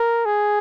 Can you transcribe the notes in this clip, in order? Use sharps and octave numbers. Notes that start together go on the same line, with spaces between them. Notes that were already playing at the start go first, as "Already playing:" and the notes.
Already playing: A#4
G#4